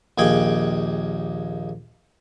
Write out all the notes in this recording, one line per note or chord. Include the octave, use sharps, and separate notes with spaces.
A#1 D#2 G#4 G5 D6